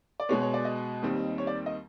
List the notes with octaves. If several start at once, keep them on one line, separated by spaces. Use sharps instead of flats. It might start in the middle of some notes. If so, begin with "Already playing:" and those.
D5
B2 G#3 B3 C#5
C#5
D5
D#5
D#2 D#3 G3 C4
C#5
D5
D#5